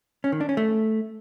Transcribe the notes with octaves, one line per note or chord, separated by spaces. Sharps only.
C#4
D#3
D4
C#4
A3